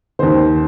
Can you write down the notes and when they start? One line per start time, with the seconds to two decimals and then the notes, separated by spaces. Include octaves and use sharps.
0.19 D#2 D#3 C5